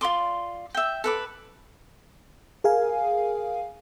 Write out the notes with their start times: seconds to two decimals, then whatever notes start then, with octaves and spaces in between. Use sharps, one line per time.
0.01 F4 D5 C6 D6
0.74 E5 G5
1.04 A4 B4 D6
2.64 G#4 A#4 F5 G#5